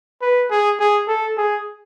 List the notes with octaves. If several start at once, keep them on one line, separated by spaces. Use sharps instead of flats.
B4
G#4
G#4
A4
G#4